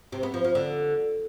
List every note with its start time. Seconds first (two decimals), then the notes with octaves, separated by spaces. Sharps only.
0.12 C3
0.23 B3
0.34 F3
0.44 F3
0.55 D3